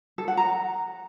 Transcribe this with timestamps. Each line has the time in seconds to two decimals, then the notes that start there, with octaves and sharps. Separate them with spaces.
0.18 A4
0.28 F#5
0.37 A#5